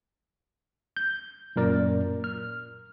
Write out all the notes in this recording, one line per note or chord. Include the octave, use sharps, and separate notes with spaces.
G6
F#2 A#2 A#4 D5
F6